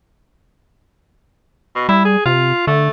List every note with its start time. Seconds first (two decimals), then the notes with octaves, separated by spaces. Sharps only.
1.75 B2
1.89 G3 E4
2.05 G#4
2.26 C3 F4
2.67 D3 A3